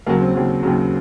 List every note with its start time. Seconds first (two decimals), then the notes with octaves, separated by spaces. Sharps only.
0.06 D#2 C#3 F#3 A#3
0.21 C4
0.34 D#2 C#3 F#3
0.63 D#2 C#3 F#3